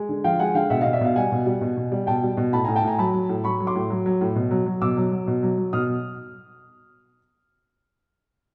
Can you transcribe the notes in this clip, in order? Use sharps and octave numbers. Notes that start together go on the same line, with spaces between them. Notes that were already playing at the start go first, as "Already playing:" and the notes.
Already playing: G#3 G#5
D3
F3 F5 G5
G#3 F#5 G#5
D3 F5 G5
B2 E5 F#5
B2 D#5 F5
D5 E5
B2 D#5 F5
G3 F#5 G#5
B2
G3
B2
B2
G3
B2 G5 A5
G3
B2
A2 A5 B5
A2 G#5 A#5
G5 A5
A2 G#5 A#5
F#3 A5 B5
F#3
A2
F#3 B5 C#6
F#3
C6 D6
A2
F#3
F#3
A2
B2
F#3
F#3
B2 D6 E6
F#3
F#3
B2
F#3
F#3
B2 D#6 F6